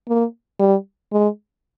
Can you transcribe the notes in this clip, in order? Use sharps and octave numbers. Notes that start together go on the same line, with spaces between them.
A#3
G3
G#3